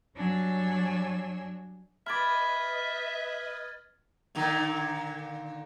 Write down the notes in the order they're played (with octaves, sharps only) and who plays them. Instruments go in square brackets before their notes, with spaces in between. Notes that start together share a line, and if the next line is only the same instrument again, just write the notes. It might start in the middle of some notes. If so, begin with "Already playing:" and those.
[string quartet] G2 F#3 D4 C#5 G#5 E6
[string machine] B4 D#5 [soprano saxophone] E5 [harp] B5 D6 [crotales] F6 G#6 A6
[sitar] A#2 D3 D#3